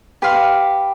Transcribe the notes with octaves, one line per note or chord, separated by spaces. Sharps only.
G4 B4 F5 C6